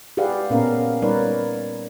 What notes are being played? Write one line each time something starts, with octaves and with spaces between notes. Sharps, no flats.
G4 G#4 B4 D5 F5 F#5
A#2 A#3 B3 C#4 A#4 F5
G3 D#4 A#4 B4 C#5 D5